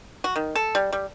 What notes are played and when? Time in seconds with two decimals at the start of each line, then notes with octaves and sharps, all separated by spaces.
0.24 F#4
0.36 D#3
0.55 A4
0.75 G3
0.93 G3